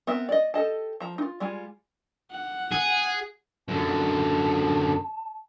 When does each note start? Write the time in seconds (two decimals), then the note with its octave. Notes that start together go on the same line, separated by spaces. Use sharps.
0.07 B3 C4 A#4 E5
0.29 D5 D#5
0.54 G4 A4 D#5 A5
1.00 F3 A#5
1.18 D#4 F4
1.40 G3 G#3 F4 G#5
2.32 F#5
2.72 G#4
3.68 F#2 D3 A5